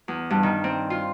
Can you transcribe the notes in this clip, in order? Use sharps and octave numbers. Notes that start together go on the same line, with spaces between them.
E2
G2
D#3
C4
F4